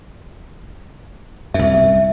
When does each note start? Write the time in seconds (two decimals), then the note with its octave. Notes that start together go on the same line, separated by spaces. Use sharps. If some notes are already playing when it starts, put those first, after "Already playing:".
1.54 C2 F#2 E5